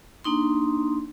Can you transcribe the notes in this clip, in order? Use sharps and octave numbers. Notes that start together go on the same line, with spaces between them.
A#3 D4 D#4 C6